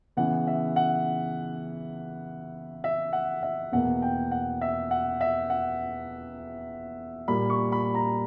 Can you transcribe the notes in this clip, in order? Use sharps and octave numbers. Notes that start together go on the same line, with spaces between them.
C#3 E3 B3 F#5
E5
F#5
E5
F#5
E5
E2 B2 A#3 F#5
G5
F#5
E5
F#5
E5
F#5
A#2 G3 A#3 B5
C#6
B5
A#5